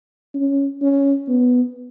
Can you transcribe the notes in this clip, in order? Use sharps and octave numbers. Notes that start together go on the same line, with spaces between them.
C#4
C#4
B3